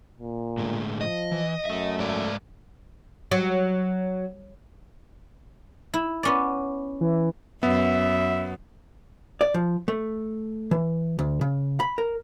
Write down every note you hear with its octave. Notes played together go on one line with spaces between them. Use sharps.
A#2
A2 D3 G#3
F3 D#5
E3
F#2 A3 E5
G#2 D5
F#3
E4
B3 C#4 D5
E3
F#2 B3 E5
D5
F3
A3
E3
D2
C#3
B5
A#4